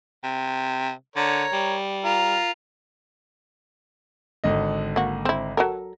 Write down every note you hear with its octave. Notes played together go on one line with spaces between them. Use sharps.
C3
D3 A#4 C#5
G3
F4 A#4
G#1 D3 D#5
A#3 F#4
C4 E4
F#3 A4 A#4